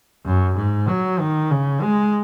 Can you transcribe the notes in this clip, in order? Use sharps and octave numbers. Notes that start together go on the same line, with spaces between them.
F#2
G#2
F#3
D#3
C#3
G#3